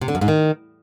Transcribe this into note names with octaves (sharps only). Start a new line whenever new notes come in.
C3
D3
F#2
G#2
D#3